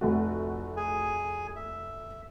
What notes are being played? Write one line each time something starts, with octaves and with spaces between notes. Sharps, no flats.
F1 A3 F#4
G#4 G#5
E5